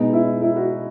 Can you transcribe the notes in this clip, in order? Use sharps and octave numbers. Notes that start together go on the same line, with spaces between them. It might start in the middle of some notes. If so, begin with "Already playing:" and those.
Already playing: B2 G#3 B3 D#4
E4
E4
F#4